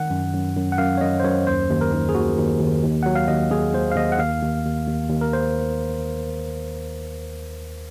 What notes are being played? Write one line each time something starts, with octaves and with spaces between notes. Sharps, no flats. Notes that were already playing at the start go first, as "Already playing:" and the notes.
Already playing: D#3 F#5
F#2
F#2
F#2
F#5
F#2 F5
C#5
F#2 D#5
C5
F#2 C#5
D#2 C5
D#2
A#4
D#3
G#4
D#2 F#4
D#2
D#2
D#2
F#3 F#5
F5
D#2 D#5
D#2 G#4
D#2 C5
F5
D#2 D#5
F#5
D#2 F5
D#2
D#2
D#2
D#2
A#4
C5